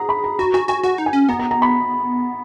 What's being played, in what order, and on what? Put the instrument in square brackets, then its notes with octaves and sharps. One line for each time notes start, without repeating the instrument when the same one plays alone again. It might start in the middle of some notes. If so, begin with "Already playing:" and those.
Already playing: [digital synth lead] G#4 [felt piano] F#5 A#5
[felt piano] B5
A#5
[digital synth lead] F#4 [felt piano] A#5
[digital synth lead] F#4 [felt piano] G#5
[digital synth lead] F#4 [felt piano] G#5
[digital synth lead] F#4 [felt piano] F#5
[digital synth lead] D#4
[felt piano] G#5
[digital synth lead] C#4
[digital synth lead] B3 [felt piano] A#5
[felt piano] A#5
A#5
B5